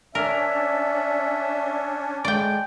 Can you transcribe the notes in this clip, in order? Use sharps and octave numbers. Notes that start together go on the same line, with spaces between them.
C#4 D4 A#4 D5 E5
A2 G#3 D5 G5